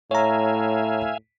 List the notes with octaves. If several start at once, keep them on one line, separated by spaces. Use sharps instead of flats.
A2 C#5 E5 F5 G#5 A#5